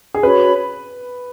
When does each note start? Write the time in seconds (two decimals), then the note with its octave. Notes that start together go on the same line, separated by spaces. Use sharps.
0.14 G#4
0.23 C#4 F#4 B4 C#5 B5